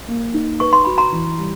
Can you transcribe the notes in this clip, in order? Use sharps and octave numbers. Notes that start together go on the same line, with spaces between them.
A#3
D#4
B4 C#6
C6
F#4 B5
A#5 C6
E3
G3